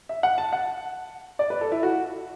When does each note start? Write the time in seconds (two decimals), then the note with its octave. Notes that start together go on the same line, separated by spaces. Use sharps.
0.09 E5
0.23 F#5
0.38 A5
0.53 F#5
1.39 D5
1.50 B4
1.61 A4
1.72 E4
1.83 F#4